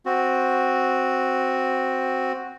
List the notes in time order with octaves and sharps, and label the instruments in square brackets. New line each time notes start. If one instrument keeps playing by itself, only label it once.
[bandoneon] C4 F#4